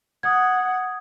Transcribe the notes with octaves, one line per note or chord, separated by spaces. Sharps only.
F#5 D#6 G#6